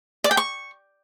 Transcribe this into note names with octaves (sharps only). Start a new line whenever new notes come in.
D5
G5
C#6